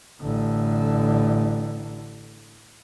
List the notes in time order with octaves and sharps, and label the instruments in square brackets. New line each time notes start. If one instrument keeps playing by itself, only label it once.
[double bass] A1 D3